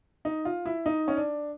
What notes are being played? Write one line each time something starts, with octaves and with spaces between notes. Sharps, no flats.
D#4
F4
E4
D#4
C#4
D4